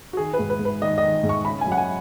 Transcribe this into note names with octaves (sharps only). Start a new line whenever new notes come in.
F#4
D#3 G#4
B4
G#2
B4
G#2
B4
D#3 D#5
D#3 D#5
G#2
C#6
C#3 B5
G#5
F#2
F#5
G#5